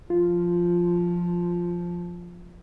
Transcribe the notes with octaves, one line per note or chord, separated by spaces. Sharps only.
F3 F4